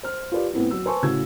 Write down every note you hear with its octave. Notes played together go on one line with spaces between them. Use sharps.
C5 F6
F4 G4 B4 D5
A2 B3 C4 E4
F#3 E6
B4 C5 G#5 A5 C6 C#6
A2 C#3 F#4 E6 G#6